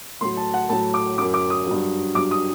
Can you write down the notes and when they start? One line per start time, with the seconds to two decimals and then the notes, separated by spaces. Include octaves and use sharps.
0.21 A2 F#3 C6
0.37 A5
0.54 F#5
0.69 A2 A5
0.72 F#3
0.94 D6
1.18 F#3 D6
1.21 F#2
1.34 D6
1.50 D#6
1.67 G2 F#3
2.15 G2 F#3 D6
2.31 D#6